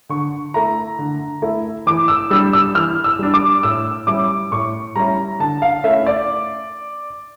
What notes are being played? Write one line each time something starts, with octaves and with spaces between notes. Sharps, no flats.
D3 C#6
A3 E4 A#5
D3
A3 E4
E3 D6
E6
G3 D4 E6
E6
E3 F6
E6
G3 D4
D6
A2 E6
G3 C#4 E4 D6
A2 C#6
G3 C#4 E4 A#5
D3 A5
F5
A3 C#4 E4 E5
D5